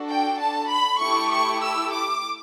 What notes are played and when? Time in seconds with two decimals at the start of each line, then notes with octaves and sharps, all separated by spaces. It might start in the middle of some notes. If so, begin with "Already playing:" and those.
Already playing: D4 F#4 A4
0.09 G5
0.38 A5
0.69 B5
0.99 A3 E4 G4 C#6
1.31 C#6
1.61 E6
1.92 D6